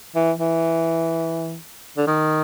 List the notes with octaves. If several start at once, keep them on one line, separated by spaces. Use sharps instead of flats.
E3
E3
D3
D#3